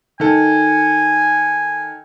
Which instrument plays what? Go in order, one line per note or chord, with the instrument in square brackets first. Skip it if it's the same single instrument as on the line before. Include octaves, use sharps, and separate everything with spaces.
[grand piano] D#3 A4 [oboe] G#5